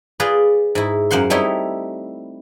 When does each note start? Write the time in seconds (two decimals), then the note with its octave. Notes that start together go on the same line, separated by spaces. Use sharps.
0.20 F4 G#4 B4 D5
0.75 G#2 E4
1.11 F#2 A#3 C5 F#5 C6
1.30 G3 A3 C4 D#4 E4 C#5